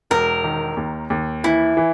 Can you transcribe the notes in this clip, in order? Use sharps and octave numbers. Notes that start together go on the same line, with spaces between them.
E1 A#4
D#3
D#2
D#2
E3 E4
E3